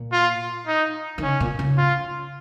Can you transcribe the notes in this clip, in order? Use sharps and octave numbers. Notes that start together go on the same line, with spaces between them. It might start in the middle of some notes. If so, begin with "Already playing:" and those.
Already playing: A#2
F4
D#4
D#3
C#3 C#4
A#2
C#3
F4